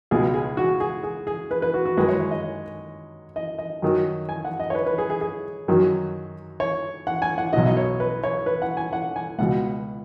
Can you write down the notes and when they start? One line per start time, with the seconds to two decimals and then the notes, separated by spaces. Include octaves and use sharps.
0.11 C#2 B2 G#3 G#4
0.34 G#4
0.57 F#4
0.80 G#4
1.03 G#4
1.27 G#4
1.51 B4
1.62 B4
1.74 F#4
1.86 F#4
1.97 F#2 D#3 G#3 B4
2.08 C#5
2.20 C#5
2.31 D#5
3.36 D#5
3.59 D#5
3.82 F#2 D#3 F#3
4.29 G#5
4.45 F#5
4.60 D#5
4.70 C#5
4.75 B4
4.86 B4
4.98 G#4
5.10 G#4
5.21 G#4
5.68 F#2 D#3 F#3
6.60 C#5
7.07 F#5
7.22 G#5
7.38 F#5
7.53 B1 B2 F#3 D#5
7.66 D#5
7.77 C#5
8.00 B4
8.24 C#5
8.46 B4
8.62 F#5
8.77 G#5
8.93 F#5
9.16 G#5
9.38 C#2 B2 G#3 F#5